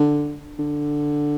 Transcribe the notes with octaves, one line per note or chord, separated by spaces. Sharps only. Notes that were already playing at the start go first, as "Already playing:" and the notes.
Already playing: D3
D3